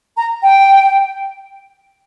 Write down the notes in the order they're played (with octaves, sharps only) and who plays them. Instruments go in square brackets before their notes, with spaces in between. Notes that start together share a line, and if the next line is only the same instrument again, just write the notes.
[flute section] A#5
G5